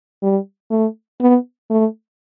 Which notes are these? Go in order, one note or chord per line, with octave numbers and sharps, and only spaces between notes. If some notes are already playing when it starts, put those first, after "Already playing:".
G3
A3
B3
A3